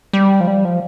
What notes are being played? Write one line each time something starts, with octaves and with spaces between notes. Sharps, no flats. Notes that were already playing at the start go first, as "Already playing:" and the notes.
G3
F3
G3
F3